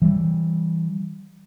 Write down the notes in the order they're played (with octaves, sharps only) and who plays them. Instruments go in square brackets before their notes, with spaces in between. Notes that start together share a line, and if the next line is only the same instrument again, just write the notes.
[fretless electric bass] E3 G3